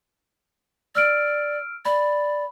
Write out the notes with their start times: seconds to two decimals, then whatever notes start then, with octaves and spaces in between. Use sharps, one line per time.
0.95 D5 E6 F6 D7
1.85 D5 B5